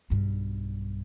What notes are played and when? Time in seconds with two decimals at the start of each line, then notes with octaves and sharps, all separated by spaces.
0.10 B1 G2